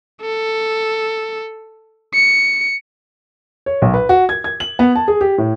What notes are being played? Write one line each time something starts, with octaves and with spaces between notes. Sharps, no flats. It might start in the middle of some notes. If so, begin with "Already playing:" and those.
A4
C#7
C#5
B1
B4
F#4
G#6
G#6
F#7
B3
A5
G#4
G4
A2